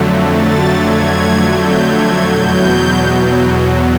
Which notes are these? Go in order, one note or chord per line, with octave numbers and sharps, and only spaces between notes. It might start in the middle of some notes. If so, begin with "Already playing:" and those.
Already playing: F2 D3 F#3 A3
A6
G#6
G6
G#6
E2 B2 F#3 G6